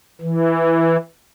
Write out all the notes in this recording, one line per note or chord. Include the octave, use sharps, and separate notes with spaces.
E3